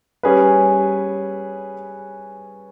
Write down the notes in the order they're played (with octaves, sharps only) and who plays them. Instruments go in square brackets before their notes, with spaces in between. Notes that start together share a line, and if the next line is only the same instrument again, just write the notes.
[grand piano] G3 C#4 G#4 B4